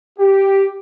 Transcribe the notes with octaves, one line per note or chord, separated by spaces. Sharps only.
G4